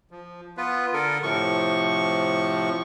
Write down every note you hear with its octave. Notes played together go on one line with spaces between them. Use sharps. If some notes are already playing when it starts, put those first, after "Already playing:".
F3
B3 F4 B4
D3 A4 A#4
A2 C3 F3 C#6